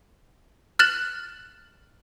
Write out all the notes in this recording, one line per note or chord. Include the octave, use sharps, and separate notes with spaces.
F6 F#6 A6 E7 F#7